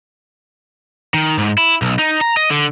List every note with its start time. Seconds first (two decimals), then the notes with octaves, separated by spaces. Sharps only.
1.14 D#3
1.38 G#2
1.58 E4
1.82 B1
1.99 D#4
2.21 A#5
2.37 D#5
2.51 D3